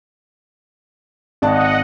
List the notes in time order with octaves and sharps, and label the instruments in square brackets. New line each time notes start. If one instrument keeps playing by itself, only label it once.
[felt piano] G#1 D5 A5 [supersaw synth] D#5 F#5